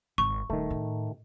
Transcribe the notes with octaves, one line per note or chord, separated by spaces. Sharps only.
G#1 C#6
D#1 D#3 A3
A2